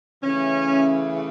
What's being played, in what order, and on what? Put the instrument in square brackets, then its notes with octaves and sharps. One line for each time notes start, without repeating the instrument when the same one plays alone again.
[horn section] C#3 E3 A3 C#4